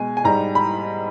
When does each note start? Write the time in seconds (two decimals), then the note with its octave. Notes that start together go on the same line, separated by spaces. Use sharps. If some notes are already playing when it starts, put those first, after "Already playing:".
Already playing: B2 G#3 G#5
0.17 G#5
0.24 G#2 G3 A#5
0.55 B5